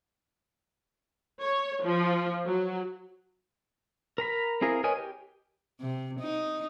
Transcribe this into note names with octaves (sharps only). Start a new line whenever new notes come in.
C#5
F3
F#3
A#4 A#5 B5
C4 E4 G#4 A#4 F5
A#4 B4 C#5 D#5 G#5
G4
C3
D#4